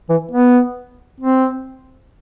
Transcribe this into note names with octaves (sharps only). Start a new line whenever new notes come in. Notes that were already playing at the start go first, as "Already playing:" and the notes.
E3
B3
C4